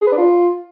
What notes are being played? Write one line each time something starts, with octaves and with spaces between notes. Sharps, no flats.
G#4
B4
D4
F4